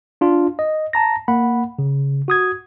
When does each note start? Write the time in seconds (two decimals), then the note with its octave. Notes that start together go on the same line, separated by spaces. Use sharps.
0.21 D4 F4
0.59 D#5
0.93 A5 A#5 A#6
1.28 A#3 F#5 B5
1.79 C#3
2.28 F#4 D#6 G#6